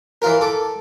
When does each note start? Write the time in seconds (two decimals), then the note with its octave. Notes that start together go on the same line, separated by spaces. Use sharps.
0.22 E3 F4 A#4
0.41 A4 D6